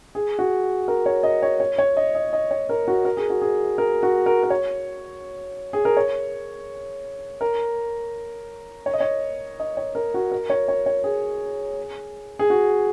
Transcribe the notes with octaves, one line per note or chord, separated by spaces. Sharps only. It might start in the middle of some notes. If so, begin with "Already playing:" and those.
G#4
F#4
A#4
C#5
D#5
C#5
C#5
C#5
D#5
D#5
D#5
C#5
A#4
F#4
A#4
G#4
F#4
G#4
A#4
F#4
A#4
A#4
C#5
G#4
A#4
C#5
A#4
C#5
D#5
C#5
D#5
C#5
A#4
F#4
A#4
C#5
C#5
C#5
G#4
G#4
F#4